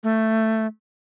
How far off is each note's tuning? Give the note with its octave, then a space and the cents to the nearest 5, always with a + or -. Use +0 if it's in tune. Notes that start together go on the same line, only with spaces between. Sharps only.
A3 +10